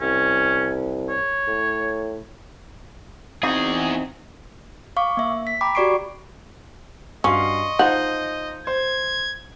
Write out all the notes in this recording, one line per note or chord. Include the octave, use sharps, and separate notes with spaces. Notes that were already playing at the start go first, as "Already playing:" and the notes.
C2 C#4
C#5
A2
E2 C4 D#4 F#4 G#4
F5 C#6 D6
A#3 E5
B6
G5 A#5 B5 D6
F#4 G4 D5 C#6 C7 D7
G2 C#4 F#4 D#5 F5 C6 C#6
F3 D#4 C5 F#5 G6
C5 G#6